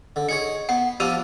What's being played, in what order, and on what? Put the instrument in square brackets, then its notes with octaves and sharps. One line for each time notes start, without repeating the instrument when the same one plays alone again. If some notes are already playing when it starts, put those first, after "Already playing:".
[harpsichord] D3
[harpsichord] D#4 G#4 C#5 [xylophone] C#7
[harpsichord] B3 [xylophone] F#5
[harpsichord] F3 B3 D4 [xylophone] G4 E6 F7